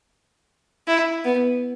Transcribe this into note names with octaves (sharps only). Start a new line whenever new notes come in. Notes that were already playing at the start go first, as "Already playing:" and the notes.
E4
B3